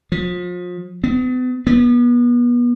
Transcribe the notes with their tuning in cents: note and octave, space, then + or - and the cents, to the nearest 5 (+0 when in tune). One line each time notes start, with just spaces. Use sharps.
F3 +35
B3 +40
B3 -35